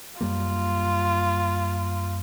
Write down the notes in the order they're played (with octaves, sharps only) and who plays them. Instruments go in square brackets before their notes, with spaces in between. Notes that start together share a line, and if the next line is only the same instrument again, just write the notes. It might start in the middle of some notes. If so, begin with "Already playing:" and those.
[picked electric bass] F#2 G3 A#3 [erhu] F4